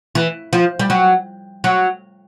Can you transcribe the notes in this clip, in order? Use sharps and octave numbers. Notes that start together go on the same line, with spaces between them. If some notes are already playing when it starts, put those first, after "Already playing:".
E3
F3
G3
F#3
F#3